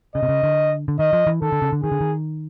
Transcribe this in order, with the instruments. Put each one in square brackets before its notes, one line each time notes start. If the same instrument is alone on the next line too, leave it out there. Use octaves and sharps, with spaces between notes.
[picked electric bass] C#3 [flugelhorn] D#5
[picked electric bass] C3
C#3
D3
D3
[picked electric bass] D#3 [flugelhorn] D#5
[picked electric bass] F3
E3
[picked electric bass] D#3 [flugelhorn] A4
[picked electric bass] D3
C#3
D3
[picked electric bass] D#3 [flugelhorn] G#4
[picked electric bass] D3
D#3